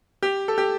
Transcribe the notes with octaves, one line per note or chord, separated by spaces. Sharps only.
G4
A4
G4